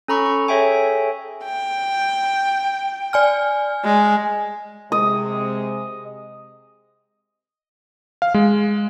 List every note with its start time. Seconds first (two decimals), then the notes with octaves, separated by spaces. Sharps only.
0.08 C#4 A4 A#5 B5 C#6
0.26 C#6
0.48 G#4 A4 C#5 E5 G5 G#5
1.46 G5
3.13 D5 G#5 F6
3.84 G#3
4.92 C3 G#3 D#5
8.22 F5
8.34 G#3